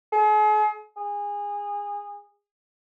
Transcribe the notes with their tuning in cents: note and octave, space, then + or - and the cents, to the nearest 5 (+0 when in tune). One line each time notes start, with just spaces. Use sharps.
G#4 +40
G#4 -25